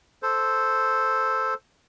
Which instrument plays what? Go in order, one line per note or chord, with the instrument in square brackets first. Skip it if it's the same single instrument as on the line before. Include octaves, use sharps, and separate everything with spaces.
[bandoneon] A4 C5